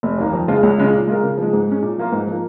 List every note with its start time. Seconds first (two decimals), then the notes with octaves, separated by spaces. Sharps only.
0.03 F1
0.18 D#2 D#3 A#3
0.33 F2
0.48 C#3 F3 G#3 F4
0.63 C#2
0.78 C#3 G#3 C#4 F4
0.93 A#2
1.07 G#3 F4 A#4
1.23 C#3
1.38 F3 G#3
1.53 G#2
1.67 G#3 C#4
1.82 A#2
1.98 F3 A#3 F4
2.12 G#2
2.27 F3 A#3